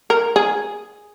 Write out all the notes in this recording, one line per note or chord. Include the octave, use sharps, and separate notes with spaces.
A#4
G#4